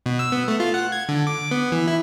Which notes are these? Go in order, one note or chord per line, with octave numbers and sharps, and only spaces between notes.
B2
E6
B3
A3
F4
F#5
G#6
D3
D6
B3
E3
E4